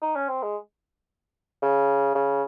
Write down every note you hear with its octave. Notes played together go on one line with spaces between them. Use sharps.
D#4
C#4
C4
G#3
C#3
C#3